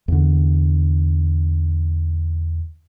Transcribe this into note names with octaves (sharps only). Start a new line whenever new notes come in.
E2 D3